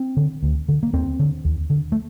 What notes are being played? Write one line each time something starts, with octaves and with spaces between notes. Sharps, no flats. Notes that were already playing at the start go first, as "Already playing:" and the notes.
Already playing: C4
D3
D2
D3
A#3
D#2 C4
D3
D#2
D3
A3